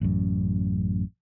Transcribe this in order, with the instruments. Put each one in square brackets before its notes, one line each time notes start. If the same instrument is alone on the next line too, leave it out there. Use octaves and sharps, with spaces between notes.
[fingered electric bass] A1 F#2